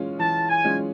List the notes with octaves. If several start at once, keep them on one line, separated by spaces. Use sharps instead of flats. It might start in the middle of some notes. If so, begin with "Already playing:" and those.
Already playing: E3 G#3 C#4 F4
E3 A5
G#5
G#3 C#4 F4